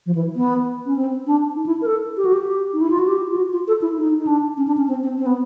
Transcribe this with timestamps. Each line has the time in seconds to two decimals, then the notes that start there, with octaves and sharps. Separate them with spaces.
0.06 F3
0.15 E3
0.36 B3
0.86 C#4
0.96 C4
1.27 D4
1.56 D#4
1.66 E4
1.82 A#4
1.86 A4
2.17 G4
2.25 F#4
2.33 G4
2.73 D#4
2.81 E4
2.90 F4
2.99 F#4
3.07 G4
3.30 F4
3.37 F#4
3.52 F4
3.68 A4
3.82 E4
3.98 D#4
4.17 D#4
4.27 D4
4.57 C#4
4.67 D4
4.77 C#4
4.88 C4
5.03 C4
5.18 C4
5.26 B3